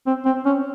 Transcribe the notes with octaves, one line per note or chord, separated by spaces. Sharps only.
C4
C4
C#4